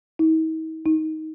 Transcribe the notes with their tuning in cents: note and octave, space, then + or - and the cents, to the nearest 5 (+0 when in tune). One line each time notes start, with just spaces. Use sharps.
D#4 +45
D#4 +15